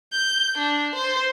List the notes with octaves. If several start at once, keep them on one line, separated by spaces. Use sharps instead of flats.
G6
D4
C5